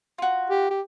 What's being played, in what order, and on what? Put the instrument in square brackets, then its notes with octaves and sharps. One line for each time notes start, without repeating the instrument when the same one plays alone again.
[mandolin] F4 F#4
[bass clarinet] G4
G4